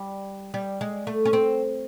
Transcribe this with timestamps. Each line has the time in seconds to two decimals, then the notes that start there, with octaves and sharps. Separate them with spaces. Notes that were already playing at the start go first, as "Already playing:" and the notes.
Already playing: G3
0.54 G3
0.81 G#3
1.07 A3
1.25 C#4
1.33 C4